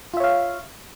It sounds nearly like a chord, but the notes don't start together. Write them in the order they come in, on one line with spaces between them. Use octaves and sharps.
F4 E5 C#5 F5